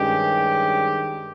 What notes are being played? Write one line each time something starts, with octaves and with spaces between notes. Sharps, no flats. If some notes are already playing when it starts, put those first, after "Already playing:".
Already playing: G2 D#3 G#3 C#4 G4